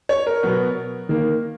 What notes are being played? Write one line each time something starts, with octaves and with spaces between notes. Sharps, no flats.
C#5
A#4
B2 F#3 B3
D#3 A#3